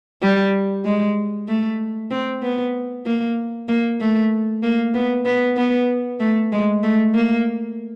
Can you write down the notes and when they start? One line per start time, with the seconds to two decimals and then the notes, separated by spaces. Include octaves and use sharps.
0.22 G3
0.85 G#3
1.48 A3
2.11 C4
2.43 B3
3.06 A#3
3.68 A#3
4.00 A3
4.63 A#3
4.94 B3
5.25 B3
5.57 B3
6.20 A3
6.52 G#3
6.83 A3
7.14 A#3